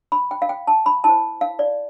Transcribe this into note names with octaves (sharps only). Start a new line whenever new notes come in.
B5
G5
F5
G5
A5
B5
E4 A4 C5 A5
F5
D5